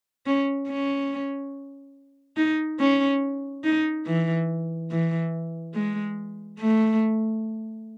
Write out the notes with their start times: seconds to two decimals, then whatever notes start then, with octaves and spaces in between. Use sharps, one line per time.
0.26 C#4
0.68 C#4
2.37 D#4
2.80 C#4
3.64 D#4
4.06 E3
4.91 E3
5.74 G#3
6.59 A3